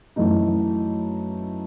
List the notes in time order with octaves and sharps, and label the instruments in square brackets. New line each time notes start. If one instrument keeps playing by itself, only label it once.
[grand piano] F#2 E3 A3 D#4